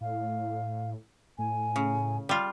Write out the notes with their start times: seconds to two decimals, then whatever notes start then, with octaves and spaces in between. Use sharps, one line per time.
0.01 A2 F5
1.38 A2 G#5
1.76 C#3
2.29 G3 F4